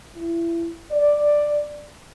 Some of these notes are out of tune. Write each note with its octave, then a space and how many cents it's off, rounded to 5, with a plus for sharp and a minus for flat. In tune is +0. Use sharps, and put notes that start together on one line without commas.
E4 +30
D5 +5